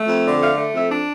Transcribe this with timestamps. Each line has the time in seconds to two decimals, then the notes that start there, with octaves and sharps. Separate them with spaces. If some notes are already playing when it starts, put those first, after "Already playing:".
Already playing: A3
0.08 F2
0.25 D3
0.41 A3 F5
0.57 A3
0.75 F2 E5
0.91 D4